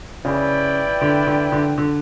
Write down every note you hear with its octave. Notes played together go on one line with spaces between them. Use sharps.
C#3 E4 B4 D5 G5
D3
D3
D3
D3